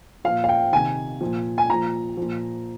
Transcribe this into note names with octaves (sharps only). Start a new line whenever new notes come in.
A#2 F3 F5
F5
G5
C3 D#3 G#5
A#2 F3
G#5
A#2 F3 A#5
A#2 F3